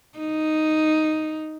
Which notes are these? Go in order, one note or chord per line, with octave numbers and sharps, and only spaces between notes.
D#4